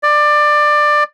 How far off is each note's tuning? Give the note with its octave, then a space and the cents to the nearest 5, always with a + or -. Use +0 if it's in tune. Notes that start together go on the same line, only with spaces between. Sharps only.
D5 +20